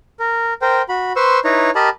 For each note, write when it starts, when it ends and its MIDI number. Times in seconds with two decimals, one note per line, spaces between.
0.20 0.53 70
0.62 0.82 70
0.62 0.82 72
0.62 0.82 79
0.89 1.13 66
0.89 1.13 83
1.16 1.39 71
1.16 1.39 72
1.16 1.39 84
1.16 1.39 85
1.16 1.39 88
1.44 1.70 63
1.44 1.70 64
1.44 1.70 71
1.44 1.70 73
1.44 1.70 82
1.75 1.89 67
1.75 1.89 70
1.75 1.89 75
1.75 1.89 81
1.75 1.89 83